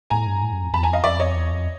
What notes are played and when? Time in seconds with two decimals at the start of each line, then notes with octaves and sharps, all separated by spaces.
0.10 A2 G#5 A#5
0.27 G2
0.43 A2
0.52 F#2
0.62 F2
0.73 F2 A5 B5
0.80 E2
0.83 F2 G#5 A#5
0.93 D#5 F5
1.04 F2 D5 E5
1.20 C#5 D#5
1.35 E2
1.51 F2